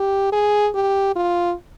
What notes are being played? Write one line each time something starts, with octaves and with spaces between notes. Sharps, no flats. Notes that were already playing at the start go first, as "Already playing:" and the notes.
Already playing: G4
G#4
G4
F4